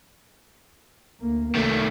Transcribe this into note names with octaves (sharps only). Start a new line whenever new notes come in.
D2 A#3
C2 D#3 A3